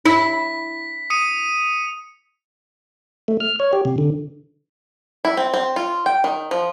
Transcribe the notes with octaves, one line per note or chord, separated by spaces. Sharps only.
E4 B6
D#6 C#7 D#7
A3
F6
C#5
G4
C3
D3
E4
C4
C4
F4
G5
D#3
F3